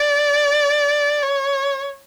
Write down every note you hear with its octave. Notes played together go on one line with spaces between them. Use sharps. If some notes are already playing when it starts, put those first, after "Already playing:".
Already playing: D5
C#5